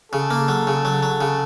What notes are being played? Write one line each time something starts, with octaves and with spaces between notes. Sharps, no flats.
C#3 A4
A#3
F#3
C#3
F#3
F#3
C#3